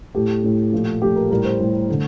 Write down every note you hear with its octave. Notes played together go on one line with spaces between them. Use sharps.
A2 A3 G4
A2 A3
A#2 F3 A3
A#2 F3 A3 G4
A#4
A2 G3 A#4
C5
A2 G3
D3 A3